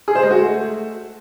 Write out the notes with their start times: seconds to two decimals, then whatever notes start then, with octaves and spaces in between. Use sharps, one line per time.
0.08 G#4
0.15 C5
0.23 G#3
0.31 F#4
0.38 A3